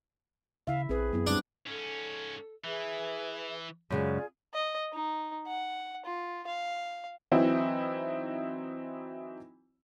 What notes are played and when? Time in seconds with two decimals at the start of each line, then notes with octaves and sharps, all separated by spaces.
0.67 C#3 E4 E5 F5
0.89 A#1 C4 G#4 B4
1.13 F#2 F#3 B3 E4
1.27 G3 C4 D4
1.66 G#2 C#4 A4
2.64 E3 G#4 B4 E5
3.90 F#2 C#3 G#3 F4 G#4 D5
4.54 D#5
4.93 D#4
5.47 F#5
6.06 F4
6.47 F5
7.32 E3 F#3 C4 D#4 E4